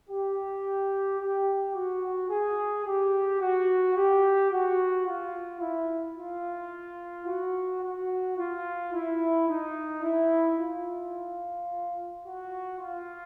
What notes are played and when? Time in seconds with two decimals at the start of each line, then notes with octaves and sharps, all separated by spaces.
0.09 G4
1.20 G4
1.74 F#4
2.29 G#4
2.85 G4
3.40 F#4
3.95 G4
4.51 F#4
5.06 F4
5.60 E4
6.16 F4
7.27 F#4
7.81 F#4
8.37 F4
8.93 E4
9.48 D#4
10.02 E4
10.57 F4
12.24 F#4
12.79 F4